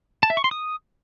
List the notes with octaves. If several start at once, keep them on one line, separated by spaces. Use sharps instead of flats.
A5
E5
C#6
C6
D#6